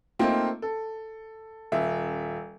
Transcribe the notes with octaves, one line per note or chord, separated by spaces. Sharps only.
A3 A#3 C4 D#4 F4
A4
D#1 E5